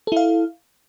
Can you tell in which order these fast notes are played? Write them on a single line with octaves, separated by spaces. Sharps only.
A4 E4 F5